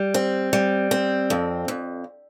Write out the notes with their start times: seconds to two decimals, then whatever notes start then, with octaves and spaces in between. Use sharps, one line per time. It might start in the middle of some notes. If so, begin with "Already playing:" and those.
Already playing: G3
0.14 C4
0.53 G3
0.91 C4
1.30 F2
1.68 F2